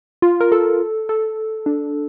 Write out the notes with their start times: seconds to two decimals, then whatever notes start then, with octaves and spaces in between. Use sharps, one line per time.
0.22 F4
0.41 A#4
0.52 A4
1.09 A4
1.66 D4